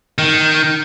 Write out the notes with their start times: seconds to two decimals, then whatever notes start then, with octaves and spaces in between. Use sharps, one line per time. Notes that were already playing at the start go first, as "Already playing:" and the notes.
0.18 D#3